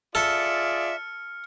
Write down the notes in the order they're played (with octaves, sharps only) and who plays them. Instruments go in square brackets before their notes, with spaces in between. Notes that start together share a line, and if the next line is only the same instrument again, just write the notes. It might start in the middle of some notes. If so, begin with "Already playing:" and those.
[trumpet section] F4 G#4 D5 [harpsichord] A4 [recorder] E5 [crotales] F6 C#7